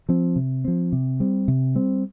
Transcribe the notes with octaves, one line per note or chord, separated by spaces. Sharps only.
F3 C4
C3
F3 C4
C3
G3 C4
C3
G3 C4